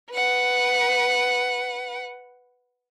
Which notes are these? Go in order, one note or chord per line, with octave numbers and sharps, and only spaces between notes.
B4 F#5